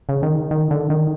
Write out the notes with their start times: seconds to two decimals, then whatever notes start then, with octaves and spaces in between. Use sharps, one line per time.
0.09 C#3
0.23 D#3
0.51 D#3
0.71 D3
0.90 D#3